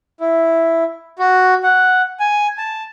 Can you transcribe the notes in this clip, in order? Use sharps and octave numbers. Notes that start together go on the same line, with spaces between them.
E4
F#4
F#5
G#5
A5